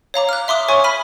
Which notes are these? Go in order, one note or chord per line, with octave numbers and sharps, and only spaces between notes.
C#5 F5 A#5 D6
F6 F#6
E5 C6 D6 D#6
C#5 E5 G#5 C#6
B5 F6 B6 D#7